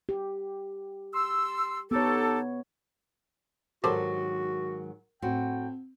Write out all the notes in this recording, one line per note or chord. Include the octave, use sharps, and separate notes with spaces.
G4
C6 E6
B3 D#4 G4 A4 C#5
G#2 D#3 F#3 F#4 G4 A4 A#4 C5
A2 C4 F#4 G5